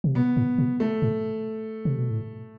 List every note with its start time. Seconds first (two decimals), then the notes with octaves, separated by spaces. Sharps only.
0.04 C3
0.15 B2 B3
0.37 A2
0.58 B2
0.80 A3
1.02 A2
1.85 C3
1.98 B2
2.10 A2